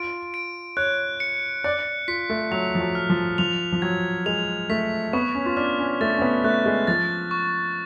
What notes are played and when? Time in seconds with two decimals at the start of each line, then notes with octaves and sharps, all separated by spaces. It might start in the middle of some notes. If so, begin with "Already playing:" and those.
Already playing: F4 D7
0.34 D7
0.77 C#5 F#6
1.20 C#7
1.64 D5 F#6
2.08 F4 B6
2.30 A3
2.51 F#3 F7
2.75 F3
2.80 F#3
2.95 F6
3.10 F3
3.38 F3 F7
3.72 F3
3.82 F#3 G#6
4.26 G#3 F7
4.70 A3 B6
5.13 B3 C#6
5.35 C#4
5.46 F4
5.57 D4 F6
5.79 C#4
6.01 A3 A6
6.17 C#4
6.22 B3
6.44 A3 F#6
6.66 G#3
6.87 F3 A6
7.31 C#6